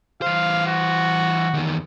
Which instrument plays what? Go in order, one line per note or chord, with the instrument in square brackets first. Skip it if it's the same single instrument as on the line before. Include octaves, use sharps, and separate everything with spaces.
[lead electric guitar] E3 C5 [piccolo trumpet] F5
[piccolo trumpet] F#4
[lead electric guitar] E2 D#3